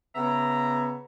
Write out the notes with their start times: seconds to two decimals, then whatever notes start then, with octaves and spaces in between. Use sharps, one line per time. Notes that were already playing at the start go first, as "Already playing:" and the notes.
0.15 C#3 B3 E5 A#5